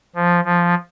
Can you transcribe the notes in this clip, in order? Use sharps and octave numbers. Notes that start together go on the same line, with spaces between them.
F3
F3